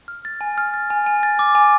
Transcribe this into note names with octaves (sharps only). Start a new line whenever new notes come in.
F6
A6
G#5
F6
A6
G#5
G#5
A6
D6
G#5